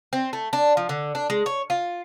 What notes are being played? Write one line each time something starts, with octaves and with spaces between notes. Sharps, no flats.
C4
A3
D4
F3
D3
D4
G#3
C#5
F4